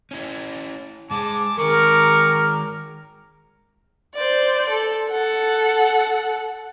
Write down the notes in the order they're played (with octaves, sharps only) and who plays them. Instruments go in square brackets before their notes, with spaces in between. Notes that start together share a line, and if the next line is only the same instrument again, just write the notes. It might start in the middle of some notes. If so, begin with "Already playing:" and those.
[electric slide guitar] C#4 E4
[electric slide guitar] G#2 G#3 [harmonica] A5 D6
[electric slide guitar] D#3 G#3 [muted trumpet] A#4 [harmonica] C#6 D6
[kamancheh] C5 D5
A4
A4 F#5